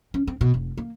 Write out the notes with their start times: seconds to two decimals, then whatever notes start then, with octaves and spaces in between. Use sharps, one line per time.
0.14 C#4
0.27 C4
0.41 B2
0.54 F1
0.77 A#3